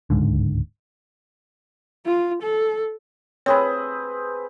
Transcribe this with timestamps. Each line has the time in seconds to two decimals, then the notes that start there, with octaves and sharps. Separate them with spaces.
0.10 D1 C#2 G#2 D3
2.05 F4
2.42 A4
3.46 C4 G#4 B4 C#5